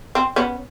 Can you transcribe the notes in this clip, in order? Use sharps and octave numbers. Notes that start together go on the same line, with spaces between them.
C4
B3 C#4